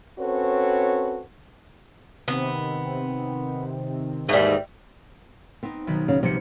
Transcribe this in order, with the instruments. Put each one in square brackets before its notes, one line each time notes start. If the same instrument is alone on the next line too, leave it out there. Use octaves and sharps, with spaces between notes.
[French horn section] C4 C#4 F#4 A4 B4 C#5
[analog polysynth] C3 D#3 C4 [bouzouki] B3
[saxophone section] D#2 G#2 [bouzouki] E3 G3
[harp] B3 D#4 [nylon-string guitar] C4
[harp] B1 D#3 B4
[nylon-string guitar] C#3
[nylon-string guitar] C3 [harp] F3 G3 C#7